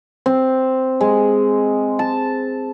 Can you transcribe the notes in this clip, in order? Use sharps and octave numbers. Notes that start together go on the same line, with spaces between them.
C4
G#3
A5